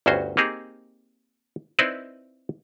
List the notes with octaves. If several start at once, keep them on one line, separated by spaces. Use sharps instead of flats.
G1 D2 G2 C#4 F#4 C5
A#3 C4 D#4 G4 G#4
C4 D#4 E4 B4 C5 D5